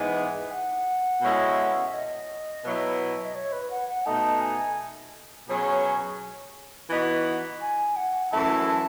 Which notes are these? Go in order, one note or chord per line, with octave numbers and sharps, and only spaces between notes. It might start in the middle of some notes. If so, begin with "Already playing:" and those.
Already playing: G#2 E3 G#3 B3 G#5
F#5
B2 G#3 C#4 E4 A4
E5
D#5
B2 F#3 B3 E4
D#5
C#5
B4
F#5
F#5
B2 A3 D#4 A5
G#5
B2 F#3 C#4 G#4
E3 B3 D#4 F#4
G#5
F#5
F#2 E3 A3 E4 A5